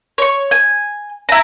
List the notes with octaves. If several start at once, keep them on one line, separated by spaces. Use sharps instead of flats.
C#5 C#6
G#5
E4 A#5